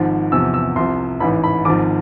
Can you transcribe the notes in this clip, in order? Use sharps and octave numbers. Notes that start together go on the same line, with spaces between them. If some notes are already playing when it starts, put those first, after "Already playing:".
Already playing: G#1 G#2 F3
E2 C3 F3 E6
E6
C2 C3 F3 C6
A1 G#2 E3 B5
B5
G#1 G#2 F3 D6